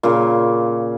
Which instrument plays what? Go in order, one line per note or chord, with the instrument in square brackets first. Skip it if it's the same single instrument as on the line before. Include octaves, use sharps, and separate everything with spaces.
[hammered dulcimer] A#2 C#3